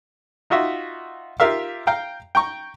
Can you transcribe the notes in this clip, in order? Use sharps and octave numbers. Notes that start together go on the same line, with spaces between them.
D#4 F4 F#4 E5
F4 G4 A#4 E5 F5
F5 G5 A#5
G5 A#5 C#6